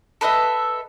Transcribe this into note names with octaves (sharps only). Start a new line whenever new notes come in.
A4 B4 D#5 E5